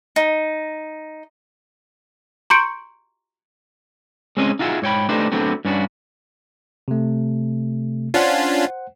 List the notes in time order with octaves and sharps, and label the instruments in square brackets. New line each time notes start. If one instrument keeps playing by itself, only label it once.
[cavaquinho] D#4
[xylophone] A#5 C6 C#6 G6 C#7 D7
[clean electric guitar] G#3 C4 C#4 D#5
D#4 F4 F#4 G#4 E5
G#2 C#5 G5 B5
A3 D4 D#4 G4 B4 C5
D2 D3 F#3 A3 B3 C4
G2 C#4 D4 F#4
[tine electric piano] C3 A3
[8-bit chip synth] C#4 D4 F4 [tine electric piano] C5 F#5